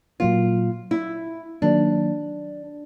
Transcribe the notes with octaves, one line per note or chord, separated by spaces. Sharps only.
A#2 F#3 A#3 F4
E4
D#3 F#3 A#3 D4